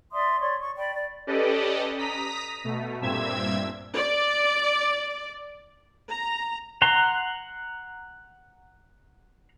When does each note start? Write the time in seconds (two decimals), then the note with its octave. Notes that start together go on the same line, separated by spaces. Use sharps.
0.12 D5 E5 C6 D#6
0.40 C#5 D5 C6 C#6
0.60 C#6
0.76 D5 G5 B5
0.94 D5
1.27 C#4 G4 A4 B4 D5 D#5
1.98 A#5 D#6 B6
2.64 B2 A3
3.01 G2 A#2 C4 E5 E6 G#6
3.95 D5
6.10 A#5
6.82 F#5 A#5 C6